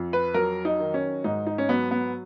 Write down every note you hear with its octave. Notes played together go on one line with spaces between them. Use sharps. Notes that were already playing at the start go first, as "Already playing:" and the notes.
Already playing: F2
B4
F#3 A#4
D#4
D#3
C#4
G#2 D#4
D#4
C#4
F#3 B3
B3